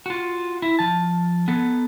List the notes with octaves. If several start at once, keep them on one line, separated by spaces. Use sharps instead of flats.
F4 F#4
E4
F3 A5
B3 A4